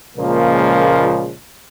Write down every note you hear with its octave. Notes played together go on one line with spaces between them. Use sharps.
C#2 A#2 C#3 F3 G#3 A#3